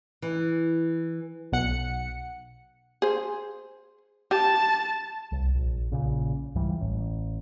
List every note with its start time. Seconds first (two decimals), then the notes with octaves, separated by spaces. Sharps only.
0.22 E3
1.52 B1 F#5 C#7
3.02 G#4 C5
4.31 G4 A5
5.32 C2
5.55 A#1
5.91 A#1 A#2 C#3
6.55 C#2 G#2 E3 G3
6.81 A1